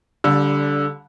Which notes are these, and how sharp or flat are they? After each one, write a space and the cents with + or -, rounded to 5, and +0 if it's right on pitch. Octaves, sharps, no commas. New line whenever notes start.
D3 -20 G3 +0 F5 +15